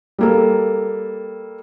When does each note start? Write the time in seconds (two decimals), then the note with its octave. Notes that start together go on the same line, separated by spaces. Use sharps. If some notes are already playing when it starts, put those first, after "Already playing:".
0.19 G3 A#3 A4